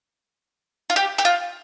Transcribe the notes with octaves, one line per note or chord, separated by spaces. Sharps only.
F4
G4
G4
F4